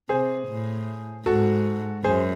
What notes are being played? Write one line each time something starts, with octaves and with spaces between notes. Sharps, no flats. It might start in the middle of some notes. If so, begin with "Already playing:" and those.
C3 G#4 C5
A2
G#2 F#4 A4
F#2 G#4 C5